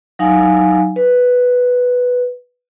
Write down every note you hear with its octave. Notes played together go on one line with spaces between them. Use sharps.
F#3 D#4 F5 G#5
B4